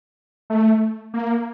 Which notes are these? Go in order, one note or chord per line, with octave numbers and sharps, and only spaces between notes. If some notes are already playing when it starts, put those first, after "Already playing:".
A3
A#3